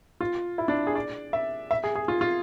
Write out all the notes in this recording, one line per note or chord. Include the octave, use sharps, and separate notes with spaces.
F4
E4
D4
G#4
D5
E5
E5
G#4
G#4
F4
F4